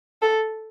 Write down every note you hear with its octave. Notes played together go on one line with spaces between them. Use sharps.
A4